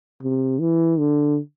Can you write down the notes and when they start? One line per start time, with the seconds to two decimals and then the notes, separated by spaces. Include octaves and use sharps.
0.23 C3
0.60 E3
0.99 D3